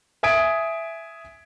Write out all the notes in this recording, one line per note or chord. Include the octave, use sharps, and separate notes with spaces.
E5 G#5 D#6 G#6 B6 D7